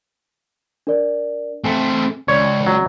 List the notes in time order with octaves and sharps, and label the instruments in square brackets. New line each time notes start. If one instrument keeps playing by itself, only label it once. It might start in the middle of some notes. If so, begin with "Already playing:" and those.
[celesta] D4 A#4 D5
[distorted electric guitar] A3 C4 [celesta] G#5
[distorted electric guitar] C#2 [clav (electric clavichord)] C#5 [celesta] D5
[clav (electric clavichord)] F#3